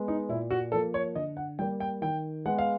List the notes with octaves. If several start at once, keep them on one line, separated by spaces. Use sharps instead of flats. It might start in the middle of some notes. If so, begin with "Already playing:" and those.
Already playing: G#3 B3
D#4
A#2 E4
F#4
F3 A#3 A4
C#5
D3 D#5
F#5
G3 A#3 G5
G5
D#3 G5
G#3 B3 F#5
F5